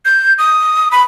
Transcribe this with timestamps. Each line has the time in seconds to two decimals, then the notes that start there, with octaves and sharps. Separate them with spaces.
0.05 G6
0.38 D#6
0.92 B5